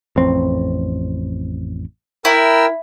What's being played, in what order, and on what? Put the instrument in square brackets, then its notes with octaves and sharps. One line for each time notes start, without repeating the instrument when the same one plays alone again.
[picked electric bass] A1 F2 C4
[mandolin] E4 [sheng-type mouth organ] A#4 G5 E6